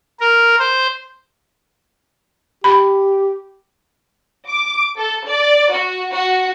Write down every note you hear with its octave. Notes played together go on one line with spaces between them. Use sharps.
A#4
C5
G4 B5
D6
A4
D5
F#4
F#4